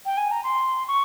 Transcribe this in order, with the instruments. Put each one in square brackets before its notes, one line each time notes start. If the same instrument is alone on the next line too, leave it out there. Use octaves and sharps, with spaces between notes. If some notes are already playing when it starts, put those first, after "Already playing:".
[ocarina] G5
G#5
A#5
C6
C#6